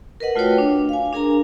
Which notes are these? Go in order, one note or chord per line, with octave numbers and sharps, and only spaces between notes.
A#4 B4 D#5 F#5
A3 F4 F#4 B4 C#5 G5
D4
F5 G#5
D4 G#4 A#4 G#5 A#5